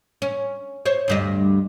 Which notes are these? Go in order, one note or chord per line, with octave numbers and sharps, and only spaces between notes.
C#4
C5 C#5
D2 G2 D#5